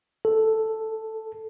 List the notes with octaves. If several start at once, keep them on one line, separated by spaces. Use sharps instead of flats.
A4